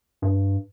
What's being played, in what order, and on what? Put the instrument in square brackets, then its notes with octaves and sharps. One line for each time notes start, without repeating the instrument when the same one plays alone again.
[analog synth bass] G2